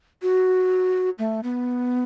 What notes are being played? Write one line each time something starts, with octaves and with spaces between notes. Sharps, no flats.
F#4
A3
B3